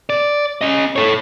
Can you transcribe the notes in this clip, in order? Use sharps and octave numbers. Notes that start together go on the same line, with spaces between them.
D5
C#4 D#5
A4 C#5